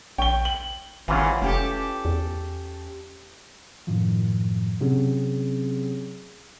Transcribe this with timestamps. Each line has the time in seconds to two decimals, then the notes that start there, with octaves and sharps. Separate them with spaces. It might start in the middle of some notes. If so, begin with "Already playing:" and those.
0.18 A#1 C#5 G5 G7
0.45 F#7
1.08 G#1 D#2 G#2 C#3 E3 F#3 F4
1.42 F1 C#4 G4 A4
2.05 E2
3.87 F#2 A2 D#3 F3
4.80 C3 F#3 C4 C#4 G#4